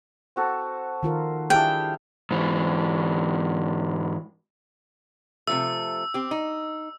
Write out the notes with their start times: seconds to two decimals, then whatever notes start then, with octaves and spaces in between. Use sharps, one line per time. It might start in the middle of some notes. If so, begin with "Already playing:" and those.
0.36 C4 F#4 A4
1.03 D#3 F4 A#4
1.50 D4 E4 G4 G#4 E5 F5 G5
2.31 G#2 E3
5.47 C3 F3 A3 E6
6.14 C4 G4
6.31 D#4